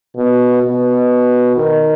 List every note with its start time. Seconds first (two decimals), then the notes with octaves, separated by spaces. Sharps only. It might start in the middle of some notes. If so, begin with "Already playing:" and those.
0.16 B2
0.63 B2
1.57 D#3